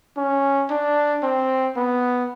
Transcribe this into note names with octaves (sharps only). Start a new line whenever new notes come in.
C#4
D4
C4
B3